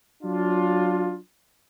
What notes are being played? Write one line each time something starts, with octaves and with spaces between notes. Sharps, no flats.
F#3 D4 F4